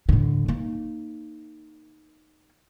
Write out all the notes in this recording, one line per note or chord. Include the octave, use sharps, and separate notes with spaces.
A2 D3
A#3 D#4